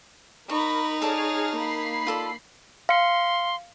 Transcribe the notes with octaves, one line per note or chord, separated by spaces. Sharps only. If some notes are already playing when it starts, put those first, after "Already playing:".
D#4 A#4 B5 C#6
G#4 A4 C#5 D5 A5 F6
A#3 B5 C7
F4 A4 D5
F5 C6 C#7